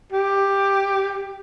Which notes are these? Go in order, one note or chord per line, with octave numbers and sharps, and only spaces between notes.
G4